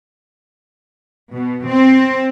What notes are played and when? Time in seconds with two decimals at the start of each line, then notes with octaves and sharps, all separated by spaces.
1.34 B2
1.68 C4